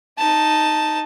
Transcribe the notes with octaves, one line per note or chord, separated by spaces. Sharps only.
D#4 A5